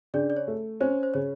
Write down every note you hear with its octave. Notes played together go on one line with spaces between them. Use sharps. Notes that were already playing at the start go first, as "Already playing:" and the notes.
C#3 D4 D5
D5
C#5
A3
C#4 C5
C5
C#3 C#5